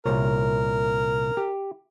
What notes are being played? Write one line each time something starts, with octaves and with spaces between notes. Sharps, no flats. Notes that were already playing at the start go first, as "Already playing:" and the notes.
C2 A#2 A#4 C#5
G4